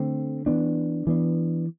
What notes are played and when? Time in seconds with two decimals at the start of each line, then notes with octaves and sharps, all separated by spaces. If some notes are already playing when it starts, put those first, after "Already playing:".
Already playing: D3 A3 C4
0.46 E3 B3 D4
1.07 E3 B3 D4